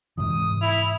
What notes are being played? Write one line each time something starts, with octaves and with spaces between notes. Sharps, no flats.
G#2 C3 E3 D#6
E4 F7